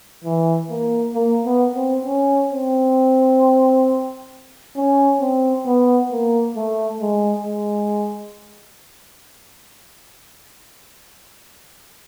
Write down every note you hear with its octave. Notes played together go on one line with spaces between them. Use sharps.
E3
A#3
A#3
B3
C4
C#4
C4
C#4
C4
B3
A#3
A3
G#3
G#3